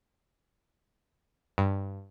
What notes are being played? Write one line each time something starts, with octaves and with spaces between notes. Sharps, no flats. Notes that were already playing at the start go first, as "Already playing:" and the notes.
G2